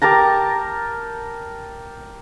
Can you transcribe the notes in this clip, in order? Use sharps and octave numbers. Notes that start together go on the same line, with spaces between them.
G4 A#4 A5 A#5